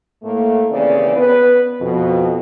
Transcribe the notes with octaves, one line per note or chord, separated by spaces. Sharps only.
A2 A3 A#3
D#2 C#3 E3 C4 C#4 D5
B3 B4
F2 B2